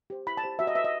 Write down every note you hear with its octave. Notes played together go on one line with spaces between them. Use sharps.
G4 C5
E4 B5
A5
G4 C5
F#4 E5
D#5
B4 E5
D#5